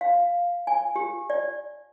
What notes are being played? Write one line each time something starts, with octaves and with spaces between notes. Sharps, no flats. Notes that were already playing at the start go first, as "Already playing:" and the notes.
F5
G#5
G4
D5